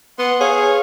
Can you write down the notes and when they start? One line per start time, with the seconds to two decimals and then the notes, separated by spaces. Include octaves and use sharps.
0.19 B3 F#5 C6
0.40 G#4 C#5 F5